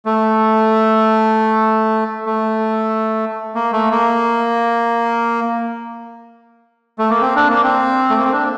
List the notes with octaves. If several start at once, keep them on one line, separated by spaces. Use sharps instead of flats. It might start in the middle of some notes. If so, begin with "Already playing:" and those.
A3
A3
A#3
A3
A#3
A3
A#3
C4
D4
A#3
C4
A3
A#3
C4
D4